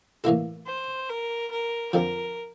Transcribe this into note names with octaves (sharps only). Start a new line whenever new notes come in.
A2 E3 A#3 E4 A4
C5
A#4
A#4
F2 D3 F3 A#4